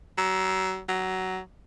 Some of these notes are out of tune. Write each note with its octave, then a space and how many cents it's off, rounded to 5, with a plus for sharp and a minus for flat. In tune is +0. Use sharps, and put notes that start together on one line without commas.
F#3 +30
F#3 +15